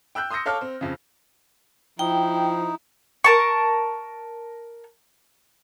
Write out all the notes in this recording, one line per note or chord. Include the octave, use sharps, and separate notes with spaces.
G5 E6 F#6 G6
C6 D#6 E6 G6 A#6 C#7
A4 C#5 F5 A5 D6 F6
C4
F2 C#3
F3 D#4 E4 G5
A#4 A5 C#6